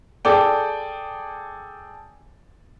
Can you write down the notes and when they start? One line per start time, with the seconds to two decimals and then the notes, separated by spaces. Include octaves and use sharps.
0.25 G#4 A4 D5 G5